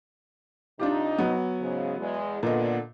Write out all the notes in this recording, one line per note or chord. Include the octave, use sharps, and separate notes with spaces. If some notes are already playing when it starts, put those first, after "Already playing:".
C3 D4 D#4 F4 G4
F#3 B3
G#2 C#3
E2 G#3
A#2 D3 B3 D#5